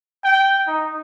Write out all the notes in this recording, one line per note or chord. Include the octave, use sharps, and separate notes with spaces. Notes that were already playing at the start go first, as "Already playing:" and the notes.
G5
D#4